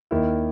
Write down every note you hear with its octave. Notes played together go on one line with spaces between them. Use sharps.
D#2 D#3 A#3 E4